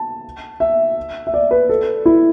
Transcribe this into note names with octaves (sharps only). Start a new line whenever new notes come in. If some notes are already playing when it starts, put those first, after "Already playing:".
Already playing: A5
E5
E5
D5
B4
A4
E4